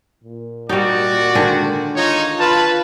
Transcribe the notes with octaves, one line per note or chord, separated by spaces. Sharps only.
A#2
G3 D#4 F#4 D5
D3 D#3 G#3
D#4 F4 C#5
F4 B4 A5